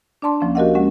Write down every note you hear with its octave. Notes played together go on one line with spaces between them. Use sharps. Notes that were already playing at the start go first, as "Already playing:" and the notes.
D4 D5 A5 C6
D2 F3 A#3 C#4
F#4 G4 A#4 D#5 F5 F#5
G#3 C#4 F#5